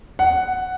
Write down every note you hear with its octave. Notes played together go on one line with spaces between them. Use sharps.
F#5